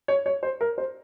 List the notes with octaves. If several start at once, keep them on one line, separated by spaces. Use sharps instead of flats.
C#5
C#5
C5
A#4
C5